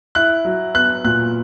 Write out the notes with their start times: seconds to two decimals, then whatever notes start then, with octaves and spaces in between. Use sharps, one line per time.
0.15 E4 F#6
0.45 F#3
0.74 B3 F#6
1.04 A#2 F#6